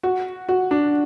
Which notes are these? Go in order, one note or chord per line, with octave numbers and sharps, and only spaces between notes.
F#4
F#4
D4